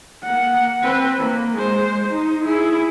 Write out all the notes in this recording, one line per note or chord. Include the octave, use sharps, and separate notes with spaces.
A#3 F#5
C4 B4
A#3
G#3 C5
D#4
E4 G#4